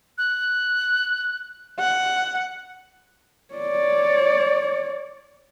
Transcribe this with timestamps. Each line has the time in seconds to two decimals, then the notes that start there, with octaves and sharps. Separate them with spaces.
0.18 F#6
1.80 F#5
3.54 C#5 D5